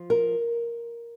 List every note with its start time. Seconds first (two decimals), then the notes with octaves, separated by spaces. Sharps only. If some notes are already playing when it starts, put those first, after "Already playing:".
Already playing: F3
0.10 A#4